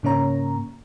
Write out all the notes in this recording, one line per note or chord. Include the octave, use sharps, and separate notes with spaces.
G#2 C#3 A#3 C#4 C#5 A#5